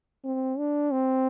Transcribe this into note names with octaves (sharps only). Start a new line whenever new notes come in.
C4
D4
C4